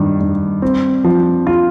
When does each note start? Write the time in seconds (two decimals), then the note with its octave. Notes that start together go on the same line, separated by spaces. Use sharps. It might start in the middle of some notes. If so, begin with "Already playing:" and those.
Already playing: G2 D#3
0.20 G2
0.62 C4
1.04 F3
1.47 F4